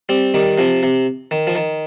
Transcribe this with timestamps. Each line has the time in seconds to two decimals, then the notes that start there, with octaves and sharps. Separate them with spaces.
0.09 G3 C4
0.34 D#3 G3
0.58 C3 F3
0.83 C3
1.31 D#3
1.47 F3
1.55 D#3